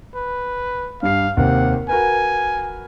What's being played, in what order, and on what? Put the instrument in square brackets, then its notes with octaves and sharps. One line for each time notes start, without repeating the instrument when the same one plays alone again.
[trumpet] B4
[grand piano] G2 G4 C7 [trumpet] F5
[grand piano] D#2 C3 C4 [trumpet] F#5
[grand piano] F#4 A#4 B4 [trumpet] G#5